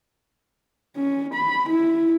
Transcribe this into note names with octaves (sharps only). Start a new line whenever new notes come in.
C#4
B5
E4